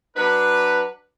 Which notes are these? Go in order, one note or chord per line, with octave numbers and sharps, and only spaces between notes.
F#3 D4 B4